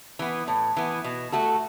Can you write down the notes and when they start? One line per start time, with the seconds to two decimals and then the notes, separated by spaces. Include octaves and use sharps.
0.19 E3 B3
0.48 A2
0.77 E3 B3
1.04 B2
1.32 A3 F#4 A4